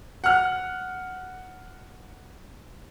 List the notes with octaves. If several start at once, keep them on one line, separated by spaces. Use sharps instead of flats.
F#5 F6